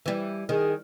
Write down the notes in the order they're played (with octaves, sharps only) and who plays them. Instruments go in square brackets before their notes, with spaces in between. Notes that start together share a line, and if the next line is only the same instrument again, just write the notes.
[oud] E3 G3
[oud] D#3 [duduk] G#4